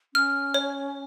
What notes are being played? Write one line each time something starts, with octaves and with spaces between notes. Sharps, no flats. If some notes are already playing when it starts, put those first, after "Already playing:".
C#4 F6
C#5